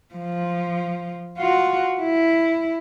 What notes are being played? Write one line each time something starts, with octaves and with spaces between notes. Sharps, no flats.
F3
F4 F#4
E4